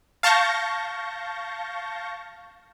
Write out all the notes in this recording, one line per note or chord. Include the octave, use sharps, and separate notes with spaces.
F5 A5 C#6 G6 A#6